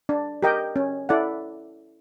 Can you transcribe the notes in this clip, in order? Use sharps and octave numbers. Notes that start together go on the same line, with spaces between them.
D4
G4 A#4 D#5 G5
C#4
E4 A4 D5 F#5